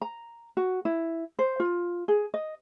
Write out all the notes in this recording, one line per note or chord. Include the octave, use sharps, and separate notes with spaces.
A#5
F#4
E4
C5
F4
G#4
D#5